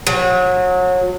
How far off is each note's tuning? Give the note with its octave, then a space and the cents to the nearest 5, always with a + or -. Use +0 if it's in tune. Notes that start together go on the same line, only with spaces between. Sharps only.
F#3 -30